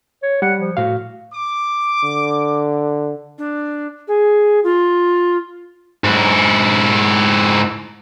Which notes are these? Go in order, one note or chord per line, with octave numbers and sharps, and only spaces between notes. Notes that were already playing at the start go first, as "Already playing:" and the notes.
C#5
G3 F#5
F3
A2 F#4 F5
D6
D3
D4
G#4
F4
G#2 E4